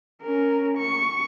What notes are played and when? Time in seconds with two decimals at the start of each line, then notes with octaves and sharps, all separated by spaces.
0.23 C#4 A#4
0.78 C#6